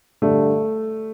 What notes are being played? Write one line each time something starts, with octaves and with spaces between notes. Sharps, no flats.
G2 D3 A3